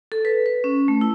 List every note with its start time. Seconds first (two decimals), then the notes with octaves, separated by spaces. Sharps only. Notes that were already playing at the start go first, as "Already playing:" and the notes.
0.12 A4
0.25 B4
0.46 B4
0.64 C#4
0.88 A3
1.01 E4